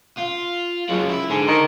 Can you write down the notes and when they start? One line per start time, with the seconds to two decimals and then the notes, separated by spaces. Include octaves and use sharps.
0.17 F4
0.89 C#2 C#3 F#3
1.09 E4
1.30 G#2 D3
1.48 D#3